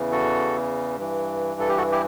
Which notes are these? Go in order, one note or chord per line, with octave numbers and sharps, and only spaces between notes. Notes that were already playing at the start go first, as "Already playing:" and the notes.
Already playing: E2 C#3 E3
F#4 A4
G2 E3
A4
G4
F#4 A4
E4 G4